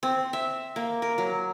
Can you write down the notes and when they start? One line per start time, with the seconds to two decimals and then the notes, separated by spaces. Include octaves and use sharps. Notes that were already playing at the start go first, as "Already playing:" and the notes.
0.03 C4
0.33 E5
0.76 A#3
1.02 A#4
1.18 F#3